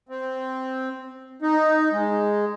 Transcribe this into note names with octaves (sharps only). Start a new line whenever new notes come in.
C4
D#4
G#3